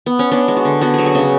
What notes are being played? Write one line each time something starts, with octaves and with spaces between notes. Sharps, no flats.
B3
C#4
B3 D4
G#3
F#4
D3
B3 F#4
F#3 G#4
F#4
C#3